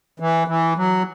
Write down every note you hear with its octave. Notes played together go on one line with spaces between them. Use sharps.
E3
E3
F#3